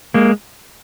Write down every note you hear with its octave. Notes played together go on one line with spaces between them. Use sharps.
G#3 A#3